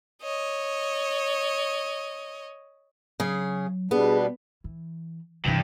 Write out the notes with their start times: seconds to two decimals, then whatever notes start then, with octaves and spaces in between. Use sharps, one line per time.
0.22 C#5 D#5
3.20 C#3 F#3 G#4
3.91 B2 G3 B3 D4 G#4
4.64 E3
5.45 G2 C3 E3